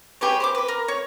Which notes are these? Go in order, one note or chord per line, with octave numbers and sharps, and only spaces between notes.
G4 G#4 B4 C#5
C5 B5 D6
B4 D6
A#4
C#5